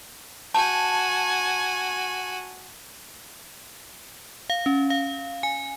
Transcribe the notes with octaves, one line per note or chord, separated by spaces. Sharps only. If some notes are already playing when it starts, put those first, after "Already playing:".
F#4 G#5 A5
F5
C#4
F5
G#5